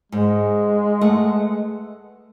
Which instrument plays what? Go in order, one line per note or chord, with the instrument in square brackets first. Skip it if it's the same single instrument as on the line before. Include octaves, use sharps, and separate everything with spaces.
[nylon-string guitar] G#2 [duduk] G#3
[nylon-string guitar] A3 B4 F#5